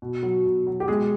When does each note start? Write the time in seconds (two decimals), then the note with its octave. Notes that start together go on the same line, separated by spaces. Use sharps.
0.02 B2
0.23 F#3
0.46 B2
0.67 F#3
0.80 G4
0.88 B2 G#3 G#4